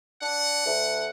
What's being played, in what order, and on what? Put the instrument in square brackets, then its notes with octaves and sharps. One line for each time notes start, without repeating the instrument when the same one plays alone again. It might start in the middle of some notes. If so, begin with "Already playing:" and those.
[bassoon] D4 [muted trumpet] F#5
[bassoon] D2